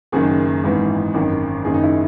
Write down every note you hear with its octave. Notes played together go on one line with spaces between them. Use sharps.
F#1 F#2 D#3 G#4
G#1 G#2 E3
G#1 F#2 D#3
F#1 F#2 D#3 G#4
D#4
E4